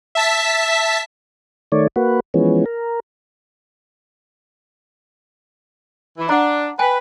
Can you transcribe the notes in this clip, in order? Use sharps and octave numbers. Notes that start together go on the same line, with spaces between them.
E5 A5 B6
D#3 A3 C#5 D5
A#3 F#4 B4
E3 F3 G#3 B3 C#4
A#4
E3 E4
D4 F#5 A#5
B4 G5 G#5